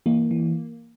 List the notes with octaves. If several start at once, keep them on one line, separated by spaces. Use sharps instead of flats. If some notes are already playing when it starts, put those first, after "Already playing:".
E3 A#3
E3